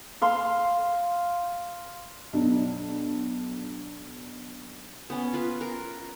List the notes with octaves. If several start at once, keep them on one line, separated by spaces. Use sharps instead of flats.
F5 C6 E6
B1 D4
B3 C#4
F4 B4
A#4